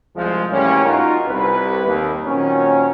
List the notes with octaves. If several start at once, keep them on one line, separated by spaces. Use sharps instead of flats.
C2 F3 G#3
A2 C#3 E3 G3 A#3 C#4
D#4 F4 F#4 A#4
C2 B4
D#2
A#2 D#3 F#3 C4 C#4